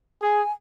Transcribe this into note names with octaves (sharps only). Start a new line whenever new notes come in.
G#4 G#5